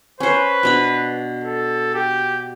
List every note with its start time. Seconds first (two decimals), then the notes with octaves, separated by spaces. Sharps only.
0.20 C#4 B4 C5
0.63 B2 D4 B5
1.44 A4
1.94 G4